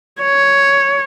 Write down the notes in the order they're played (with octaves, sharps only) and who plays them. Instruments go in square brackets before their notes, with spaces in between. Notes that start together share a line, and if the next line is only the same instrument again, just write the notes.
[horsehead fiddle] C#5